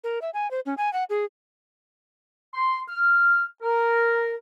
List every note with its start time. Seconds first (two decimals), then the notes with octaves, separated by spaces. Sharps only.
0.04 A#4
0.22 E5
0.34 G#5
0.51 C5
0.66 C#4
0.77 G#5
0.93 F#5
1.10 G#4
2.54 C6
2.89 F6
3.63 A#4